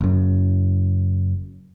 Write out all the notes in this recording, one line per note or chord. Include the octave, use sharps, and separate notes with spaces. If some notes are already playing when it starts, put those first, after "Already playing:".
F#1 F#2